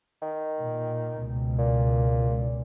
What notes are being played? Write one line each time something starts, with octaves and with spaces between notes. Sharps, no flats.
D#3
A#2
C#2 B2
A#2